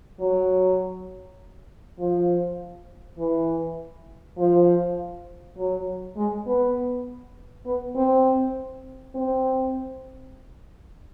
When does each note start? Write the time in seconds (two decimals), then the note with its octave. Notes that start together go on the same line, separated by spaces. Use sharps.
0.20 F#3
1.99 F3
3.19 E3
4.38 F3
5.57 F#3
6.16 G#3
6.47 B3
7.66 B3
7.96 C4
9.15 C4